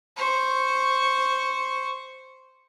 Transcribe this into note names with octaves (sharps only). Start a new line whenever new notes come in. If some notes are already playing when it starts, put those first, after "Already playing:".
C5 C#6